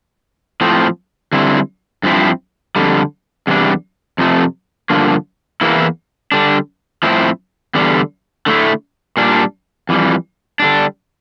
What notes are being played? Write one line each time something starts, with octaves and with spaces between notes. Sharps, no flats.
A2 F3 C4
D3 G3 C4 E4
G2 F3 C4 E4
F2 D3 G3
E2 C3 G3 D4
F2 C3 F3 A3
G2 D3 F3 A#3
E2 E3 A#3 E4
D3 G3 D4
A2 F3 C4 E4
E2 D3 G3
D3 A3 E4
A#2 G3 D4
F2 E3 G3
D3 G3 D4